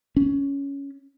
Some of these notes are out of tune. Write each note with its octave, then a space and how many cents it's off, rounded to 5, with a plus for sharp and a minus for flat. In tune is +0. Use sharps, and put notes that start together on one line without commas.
C#4 +10